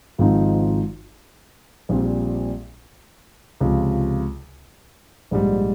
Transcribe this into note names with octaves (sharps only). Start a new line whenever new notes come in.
G#1 G#2 F3 C4 D#4
A#1 A#2 G3 C4
C#2 C3 F3
A#1 G#2 G3